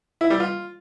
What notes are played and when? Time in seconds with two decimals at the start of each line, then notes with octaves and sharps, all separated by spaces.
0.21 E4
0.30 G3
0.40 F4